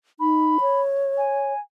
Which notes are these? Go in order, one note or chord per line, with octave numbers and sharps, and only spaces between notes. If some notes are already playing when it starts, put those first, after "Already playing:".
D#4 B5
C#5
G#5